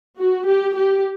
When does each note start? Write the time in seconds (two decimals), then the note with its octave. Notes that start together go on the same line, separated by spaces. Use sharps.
0.19 F#4
0.47 G4
0.75 G4